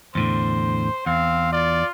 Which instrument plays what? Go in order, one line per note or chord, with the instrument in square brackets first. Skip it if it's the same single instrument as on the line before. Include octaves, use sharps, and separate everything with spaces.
[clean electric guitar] E2 A2 D3 [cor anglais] C5
[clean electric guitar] E2 [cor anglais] C4 [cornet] F5
[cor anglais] F4 [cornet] D5